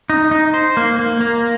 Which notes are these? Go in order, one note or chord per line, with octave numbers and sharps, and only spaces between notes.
D#4
D#4
C5
A#3
A#3
A#3